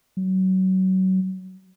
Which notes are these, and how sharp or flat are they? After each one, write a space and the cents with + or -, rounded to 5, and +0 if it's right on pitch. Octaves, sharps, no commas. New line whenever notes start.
F#3 +25